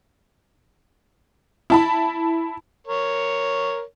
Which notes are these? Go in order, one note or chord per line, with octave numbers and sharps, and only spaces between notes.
E4 A5 B5
A#4 C#5